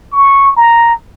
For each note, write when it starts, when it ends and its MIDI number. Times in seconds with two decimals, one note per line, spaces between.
0.12 0.56 85
0.56 0.94 82